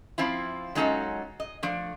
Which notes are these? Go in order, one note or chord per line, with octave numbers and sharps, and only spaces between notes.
F3 C4 E4 F4
F#3 G#3 C#4 D#4 F4 A4
D#5
F3 A3 D4